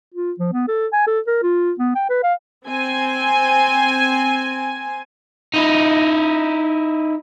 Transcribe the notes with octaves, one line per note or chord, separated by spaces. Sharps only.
F4
F3
B3
A4
G#5
A4
A#4
F4
B3
G5
B4
F5
C4 G#5
D#4 E4